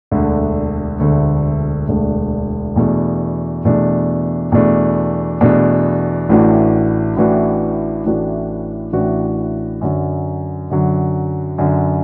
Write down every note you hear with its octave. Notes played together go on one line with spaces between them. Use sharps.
E1 D2 D3 A3
E1 D2 D3 A3
E1 D2 D3 A3
E2 B2 A3 D4
E2 B2 A3 D4
E2 B2 A3 D4
E2 B2 A3 D4
A1 A2 E3 D4 F#4
A1 A2 E3 D4 F#4
A1 A2 E3 D4 F#4
A1 A2 E3 D4 F#4
F#2 D3 F#3
F#2 D3 F#3
F#2 D3 F#3